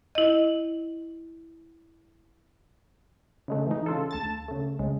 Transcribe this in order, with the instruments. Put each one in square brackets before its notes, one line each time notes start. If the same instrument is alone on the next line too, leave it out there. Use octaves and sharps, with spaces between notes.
[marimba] E4 D#5
[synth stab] C#3 G#3 A3
E3 D#4
C#3 F4 A4
D2 A5 A6
C#3 A3
C#2 C#3 G#3